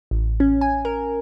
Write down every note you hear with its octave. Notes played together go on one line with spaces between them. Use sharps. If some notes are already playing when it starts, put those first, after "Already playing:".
A1
C#4
G#5
A#4